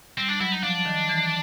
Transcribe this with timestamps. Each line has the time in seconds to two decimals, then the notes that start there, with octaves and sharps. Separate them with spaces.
0.18 G3 C4
0.29 D4
0.41 F#3 E4
0.52 D#4
0.63 F3 D4
0.86 D#3
1.09 E3